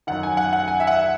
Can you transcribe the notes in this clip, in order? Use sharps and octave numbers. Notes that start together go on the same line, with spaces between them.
F#2 D#3 F#5
G#5
F#5
F#5
G#5
E5
F#5